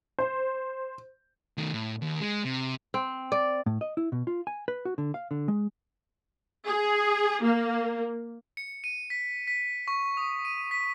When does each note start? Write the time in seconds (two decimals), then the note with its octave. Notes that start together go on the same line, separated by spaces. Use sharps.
0.19 C5
1.57 D#3 A3
1.74 A2
2.02 D#2
2.21 G#3
2.45 C3
2.94 C4
3.32 D5
3.66 A2
3.81 D#5
3.97 E4
4.12 B2
4.27 F4
4.47 G#5
4.68 B4
4.85 F#4
4.98 D3
5.14 F5
5.31 D3
5.48 G#3
6.67 G#4
7.42 A#3
8.57 C#7
8.84 D#7
9.10 B6
9.47 B6
9.88 C#6
10.17 D#6
10.45 D#7
10.71 B6